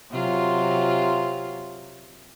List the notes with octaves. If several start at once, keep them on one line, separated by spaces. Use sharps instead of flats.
C3 F#3 F4